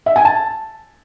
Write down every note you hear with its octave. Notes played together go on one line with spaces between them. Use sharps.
E5
G#5
A5